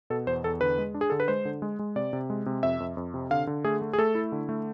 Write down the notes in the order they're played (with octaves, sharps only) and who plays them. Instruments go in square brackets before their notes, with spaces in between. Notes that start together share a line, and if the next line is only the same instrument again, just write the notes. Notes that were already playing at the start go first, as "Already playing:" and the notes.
[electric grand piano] B2 A4
E2 C5
E2 A4
D3 B4
G#3
D4
G#4
D3 A4
B4
G#3 C5
D3
G#3
G#3
C3 D5
C3
G#3
C3
F2 E5
F2
F2
C3
D3 F5
D3
A3 G#4
A3
G#4
A3 A4
E4
D3
A3